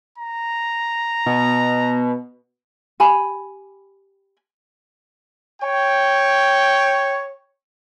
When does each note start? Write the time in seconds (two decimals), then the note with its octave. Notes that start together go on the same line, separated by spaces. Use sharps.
0.18 A#5
1.26 B2
3.00 G4 G#5 B5
5.62 C#5 G5